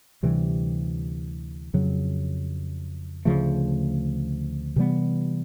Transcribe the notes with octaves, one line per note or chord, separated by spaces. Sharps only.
D2 C3 E3 G3
F2 C#3 F#3
D2 C#3 F3 A3
C3 E3 G3 B3